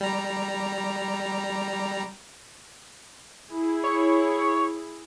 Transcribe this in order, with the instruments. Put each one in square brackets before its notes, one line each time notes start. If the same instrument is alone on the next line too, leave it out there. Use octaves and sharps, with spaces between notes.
[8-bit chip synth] G3 A#5
[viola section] E4 G#4
[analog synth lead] C#5